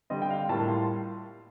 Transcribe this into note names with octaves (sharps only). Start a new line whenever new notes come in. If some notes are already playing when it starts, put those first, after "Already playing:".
D3 G3 C4 D#5
G5
F5
A2 G3 A#3 F4 A5
C6